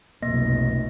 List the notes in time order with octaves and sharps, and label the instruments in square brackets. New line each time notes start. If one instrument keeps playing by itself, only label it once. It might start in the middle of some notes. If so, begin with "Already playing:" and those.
[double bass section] F1 B1 [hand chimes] A#3 D#5 A#6